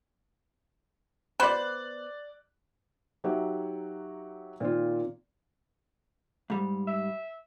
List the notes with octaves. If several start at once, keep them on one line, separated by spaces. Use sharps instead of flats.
B3 C5 D5 B5 F#6
F#3 D#4 F#4 G4 E5 F#5
A#2 D#3 C4 F4
G#2 G3
E5